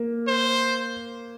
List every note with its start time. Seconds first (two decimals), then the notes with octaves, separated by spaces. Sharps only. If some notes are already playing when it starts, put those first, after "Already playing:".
Already playing: A#3
0.28 C5